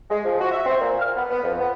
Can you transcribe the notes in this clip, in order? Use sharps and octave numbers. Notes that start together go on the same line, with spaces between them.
G#3
F3
F#4
E5
C4
A#2
F6
B3
B3
F2
B3